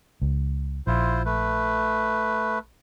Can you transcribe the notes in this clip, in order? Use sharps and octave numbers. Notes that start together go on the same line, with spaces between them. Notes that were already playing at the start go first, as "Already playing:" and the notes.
C#2
A#1 E4 F4 C5
A3 B4